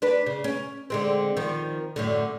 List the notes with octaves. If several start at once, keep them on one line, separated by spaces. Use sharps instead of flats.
D4 B4
C#3
C#4
D3 G#3 C4
D#3 F3
F#2 A2 D3